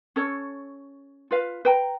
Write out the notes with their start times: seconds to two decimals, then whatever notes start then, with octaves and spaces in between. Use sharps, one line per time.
0.16 C#4 A4 C#5
1.31 F4 B4 F5
1.65 B4 G5 A#5